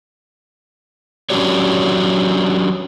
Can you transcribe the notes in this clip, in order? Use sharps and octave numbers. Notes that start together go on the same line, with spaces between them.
F#3 C#4 D4 F#4 G4 C#5